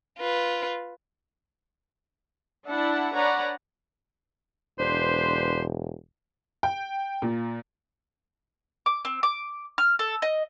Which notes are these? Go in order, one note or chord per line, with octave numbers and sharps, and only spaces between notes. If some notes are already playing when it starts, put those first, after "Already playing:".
F4 B4
D4 E4 F#5 A5
D4 B4 C#5 D5 F#5 A#5
E1 D4 B4 C5
G5
A#2
D6
C4
D6
F6
A4
D#5